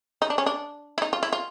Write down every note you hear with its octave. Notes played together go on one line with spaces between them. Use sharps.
D#4
D4
C#4
D4
E4
D#4
F4
E4
F4